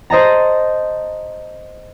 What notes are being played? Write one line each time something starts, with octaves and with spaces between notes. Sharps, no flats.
C5 D#5 A5 A#5